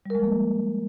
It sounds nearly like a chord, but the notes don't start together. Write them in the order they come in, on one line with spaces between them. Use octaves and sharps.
G3 A#4 G#3 F3 A#3